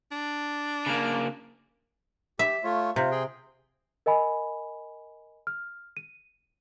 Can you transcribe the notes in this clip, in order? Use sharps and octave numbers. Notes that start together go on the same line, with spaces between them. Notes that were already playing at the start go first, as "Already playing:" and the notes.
D4
C#3 A#3
G4 E5
A3 F4 C#5
C3 F4
G#4 G5 C6
A#4 D#5 G#5 B5
F6
D#7